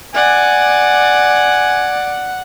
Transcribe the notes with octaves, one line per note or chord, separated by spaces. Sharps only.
D5 F#5 G#5